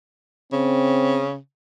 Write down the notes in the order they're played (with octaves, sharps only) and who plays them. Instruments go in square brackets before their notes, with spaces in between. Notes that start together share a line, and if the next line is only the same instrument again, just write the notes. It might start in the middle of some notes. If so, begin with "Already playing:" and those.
[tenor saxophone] C#3 [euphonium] C4